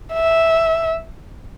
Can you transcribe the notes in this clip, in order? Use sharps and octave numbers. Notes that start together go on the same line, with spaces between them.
E5